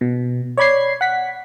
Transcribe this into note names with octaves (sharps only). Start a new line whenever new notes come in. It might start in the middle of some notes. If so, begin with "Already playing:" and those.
B2
C#5 D5 B5 G#6 C7
F#5 B6